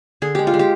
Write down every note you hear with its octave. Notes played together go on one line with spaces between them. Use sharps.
D3 G#4
G#3 G4
F4
G#3
G4